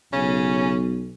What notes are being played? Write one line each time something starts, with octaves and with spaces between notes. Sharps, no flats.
B1 C#3 C#4